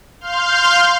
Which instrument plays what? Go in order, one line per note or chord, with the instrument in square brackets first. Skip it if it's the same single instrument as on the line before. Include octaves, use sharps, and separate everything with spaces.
[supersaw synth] F5 C6 F6 G6